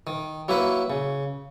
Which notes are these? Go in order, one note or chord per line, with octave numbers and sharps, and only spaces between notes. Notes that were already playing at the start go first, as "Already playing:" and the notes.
D#3
F#3 A#3 E4 B4
C#3